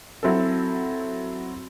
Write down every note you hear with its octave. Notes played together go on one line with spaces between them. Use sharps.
F#3 C4 E4 A4